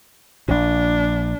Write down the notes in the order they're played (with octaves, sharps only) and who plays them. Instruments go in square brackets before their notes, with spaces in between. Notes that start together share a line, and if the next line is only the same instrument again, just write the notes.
[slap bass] A#1 A#2 [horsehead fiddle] D4